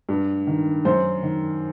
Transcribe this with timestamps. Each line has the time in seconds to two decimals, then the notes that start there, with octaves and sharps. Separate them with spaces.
0.09 G2
0.47 D#3
0.85 F#2 C5
1.23 D#3